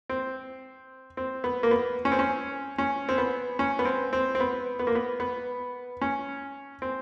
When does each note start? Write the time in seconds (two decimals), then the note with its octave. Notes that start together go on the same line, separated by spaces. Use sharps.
0.09 C4
1.17 C4
1.44 B3
1.63 A#3
1.71 B3
2.05 C#4
2.12 C4
2.19 C#4
2.78 C#4
3.09 C4
3.18 B3
3.59 C#4
3.79 B3
3.85 C4
4.13 C4
4.35 C4
4.40 B3
4.79 B3
4.87 A#3
4.95 B3
5.20 B3
6.02 C#4
6.82 C4